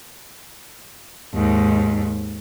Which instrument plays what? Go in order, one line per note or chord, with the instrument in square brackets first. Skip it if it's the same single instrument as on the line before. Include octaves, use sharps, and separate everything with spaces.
[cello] D#2 G#2